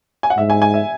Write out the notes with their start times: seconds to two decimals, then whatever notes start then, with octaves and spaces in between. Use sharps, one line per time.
0.23 G#5
0.30 F#5
0.37 G#2 E5
0.50 G#5
0.62 G#5
0.74 E5